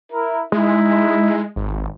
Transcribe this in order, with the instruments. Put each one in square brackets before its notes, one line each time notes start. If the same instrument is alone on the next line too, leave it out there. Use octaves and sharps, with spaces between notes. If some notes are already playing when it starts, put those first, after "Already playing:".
[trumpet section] E4 A#4
[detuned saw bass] G#3 [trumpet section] D#4 E4
[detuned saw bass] G#1